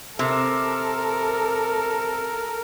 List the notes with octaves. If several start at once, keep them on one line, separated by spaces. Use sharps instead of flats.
C3 A4 A#4